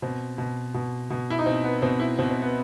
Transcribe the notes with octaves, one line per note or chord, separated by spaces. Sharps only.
B2 C4
B2
B2
B2
E4
D#4
B2 C4
B3
B2 C4
E4
B2 C4
C4
B3